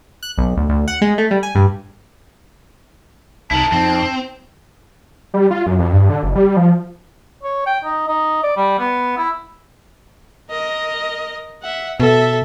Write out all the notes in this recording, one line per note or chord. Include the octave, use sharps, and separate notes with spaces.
F#6
B1
D2
D2
F#5
G#3
A3
G3
G#5
G2
C2 D#4 E4 A#4 A5
F2 C4 D#4
G3
F4
F#2
F2
G2
D3
F#1
G3
F3
C#5
G5
D#4
D#4
D5
G3
B3
E4
A#4 D#5
E5 F#5
B2 A4 E5